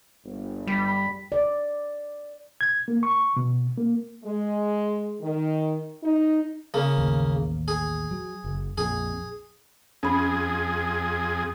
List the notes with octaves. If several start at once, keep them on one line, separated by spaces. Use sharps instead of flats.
G1
G2 G3 B5
D5
G#6
A#3
C#6
B2
A#3
G#3
D#3
D#4
C#3 A#3
A1 D#2
G#4
F#3
F#1
A#1 F2 G#4
F2 C#4 G#4 B5